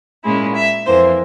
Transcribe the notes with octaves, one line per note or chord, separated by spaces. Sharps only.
A#2 G#3 C#4 E4
E5
F2 E3 A#3 C5